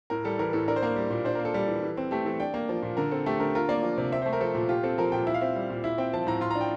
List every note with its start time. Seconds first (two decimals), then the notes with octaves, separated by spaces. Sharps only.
0.10 A2 A#4
0.25 G3 A4
0.39 E3 A#4
0.53 A2 A4
0.68 D4 A#4
0.76 C5
0.82 A#3 A#4
0.96 G3
1.10 A#2
1.25 D4 C5
1.35 A#3 A#4
1.45 A4
1.54 G3
1.68 E3
1.83 E3
1.97 C4
2.11 A3 G4
2.25 E3 A4
2.40 D4 G5
2.54 A#3
2.69 F3
2.82 A#2
2.97 D3 A#4
3.11 C4 A4
3.26 A3 G4
3.40 D3 A#4
3.55 F4 A#4
3.69 A#3 D5
3.83 F3
3.98 C3
4.12 C4 E5
4.22 A3 C5
4.33 A#4
4.41 F3 A4
4.55 A#2
4.69 F4 G4
4.83 C4 A4
4.98 F3 A#4
5.12 A#2 G5
5.27 E4 E5
5.34 F5
5.41 C4 E5
5.55 G3
5.70 A#2
5.84 E4 E5
5.98 C4 G5
6.13 F3 A5
6.27 A2 A#5
6.41 F4 C6
6.51 D4 A#5
6.61 G5